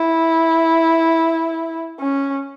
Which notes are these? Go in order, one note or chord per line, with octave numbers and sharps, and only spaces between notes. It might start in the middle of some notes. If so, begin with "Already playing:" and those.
Already playing: E4
C#4